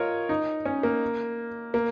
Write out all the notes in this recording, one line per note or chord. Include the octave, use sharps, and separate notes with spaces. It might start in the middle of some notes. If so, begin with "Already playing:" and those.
Already playing: F4 A#4 C#5 D#5
D#4
C#4
A#3
A#3